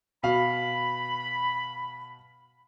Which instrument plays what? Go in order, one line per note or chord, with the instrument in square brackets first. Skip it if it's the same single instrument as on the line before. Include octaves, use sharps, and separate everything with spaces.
[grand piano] B2 F5 [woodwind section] B5